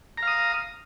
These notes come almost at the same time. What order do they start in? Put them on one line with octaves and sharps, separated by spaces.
A#5 F5 D#6